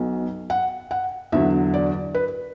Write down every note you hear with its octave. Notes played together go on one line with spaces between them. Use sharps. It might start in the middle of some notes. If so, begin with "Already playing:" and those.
Already playing: B1 B2 F#3
F#5
F#5
E2 D3 F#3 E5
D5
B4